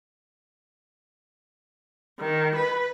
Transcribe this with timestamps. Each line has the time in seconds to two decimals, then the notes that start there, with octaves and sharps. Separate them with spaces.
2.19 D#3
2.56 B4